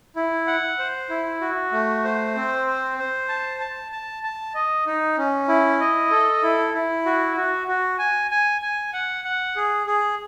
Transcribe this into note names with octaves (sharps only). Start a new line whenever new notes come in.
E4
F#5
C5
E4
F#4
A3
C5
C4
C5
C5
A5
A5
A5
A5
D#5
D#4
C#4
E4
D#5
A4
E4
E4
F#4
F#4
F#4
G#5
G#5
G#5
F#5
F#5
G#4
G#4